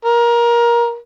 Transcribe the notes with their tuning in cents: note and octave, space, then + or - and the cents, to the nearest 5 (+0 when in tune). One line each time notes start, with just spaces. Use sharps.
A#4 +20